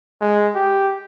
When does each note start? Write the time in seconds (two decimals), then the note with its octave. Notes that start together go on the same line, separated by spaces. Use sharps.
0.21 G#3
0.55 G4